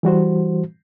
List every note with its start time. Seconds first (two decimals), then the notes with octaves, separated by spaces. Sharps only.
0.03 E3 G3 F#4 C5